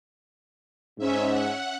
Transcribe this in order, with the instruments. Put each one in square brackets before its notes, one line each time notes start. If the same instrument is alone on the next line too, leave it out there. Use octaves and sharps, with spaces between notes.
[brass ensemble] G#2 [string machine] C#4 E5
[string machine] F#5